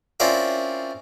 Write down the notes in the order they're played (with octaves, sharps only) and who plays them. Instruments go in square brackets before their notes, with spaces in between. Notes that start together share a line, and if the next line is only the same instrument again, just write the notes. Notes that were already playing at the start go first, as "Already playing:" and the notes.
[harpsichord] C4 C#4 E4 F4 A#4 D5